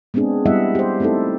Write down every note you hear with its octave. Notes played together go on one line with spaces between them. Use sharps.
G#3 B3 C4 D4 G#4
G3 B3 E4 D#5 E5 F#5
G4 C5
A3 C4 D#4 E4 A4